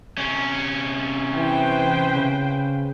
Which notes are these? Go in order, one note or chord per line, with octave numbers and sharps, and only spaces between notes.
C3 C#4
E3 B4 C5 G5
C#3